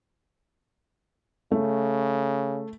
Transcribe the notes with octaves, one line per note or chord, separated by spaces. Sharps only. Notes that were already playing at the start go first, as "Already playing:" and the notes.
C#3 A3